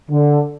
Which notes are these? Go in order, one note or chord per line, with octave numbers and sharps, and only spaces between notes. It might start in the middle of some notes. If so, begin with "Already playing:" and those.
D3